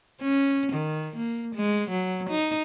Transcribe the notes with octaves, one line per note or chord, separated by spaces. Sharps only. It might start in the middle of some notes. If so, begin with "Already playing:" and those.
C#4
D#3
A#3
G#3
F#3
D#4